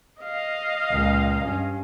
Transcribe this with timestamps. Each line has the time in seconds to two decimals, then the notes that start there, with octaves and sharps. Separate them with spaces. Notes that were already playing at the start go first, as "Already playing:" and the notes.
0.22 D#5 F5
0.91 C#2 A#2
1.44 G2 C#4